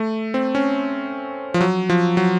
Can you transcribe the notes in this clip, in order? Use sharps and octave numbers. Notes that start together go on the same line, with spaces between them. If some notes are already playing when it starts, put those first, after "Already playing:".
Already playing: A3
C4
C#4
F3
F#3
F3
F#3